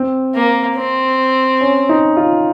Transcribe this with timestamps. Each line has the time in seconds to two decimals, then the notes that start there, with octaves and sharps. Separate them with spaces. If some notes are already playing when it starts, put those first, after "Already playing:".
Already playing: C4
0.35 A#3
0.76 C4
1.61 C#4
1.89 D#4
2.17 F4